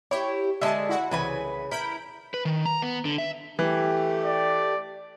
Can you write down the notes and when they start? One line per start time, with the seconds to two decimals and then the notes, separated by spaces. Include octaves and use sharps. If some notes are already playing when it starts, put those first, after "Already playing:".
0.11 E4 G4 C#5
0.61 D3 G#3 E5 A5
0.89 E4 F#4 F#5
1.11 C2 C#3 E3 B4 G#5
1.71 E4 A#4 B5 G6 D7
2.34 B4
2.45 D#3
2.66 A#5
2.82 B3
3.05 D3
3.18 E5
3.59 E3 A3 G4
4.24 D5